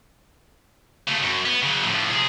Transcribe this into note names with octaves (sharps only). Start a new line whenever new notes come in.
C#3 A3
F#2
B3
C#3 F#3
A2 F3
C3 G#4